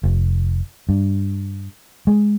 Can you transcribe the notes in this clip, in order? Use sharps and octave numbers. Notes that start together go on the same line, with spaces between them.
F1
G2
G#3